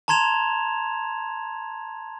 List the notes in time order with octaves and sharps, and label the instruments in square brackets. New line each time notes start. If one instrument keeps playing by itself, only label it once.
[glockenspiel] A5 A#5 C6 G#6 E7 F7